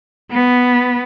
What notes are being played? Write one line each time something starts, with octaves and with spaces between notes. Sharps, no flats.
B3